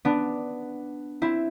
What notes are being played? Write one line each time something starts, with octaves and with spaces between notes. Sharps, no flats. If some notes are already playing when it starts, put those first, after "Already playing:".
B3 D4
C4 E4